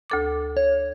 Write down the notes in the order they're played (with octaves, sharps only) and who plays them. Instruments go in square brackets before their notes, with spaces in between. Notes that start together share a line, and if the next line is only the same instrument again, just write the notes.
[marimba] D2 A4 D6
[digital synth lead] C#5